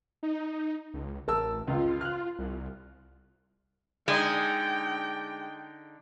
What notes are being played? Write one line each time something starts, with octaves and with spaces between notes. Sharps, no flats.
D#4
C#2
A1 A#4 A5 E6
C#2 F4
F6 F#6
C2
D3 G#3 D#4 G5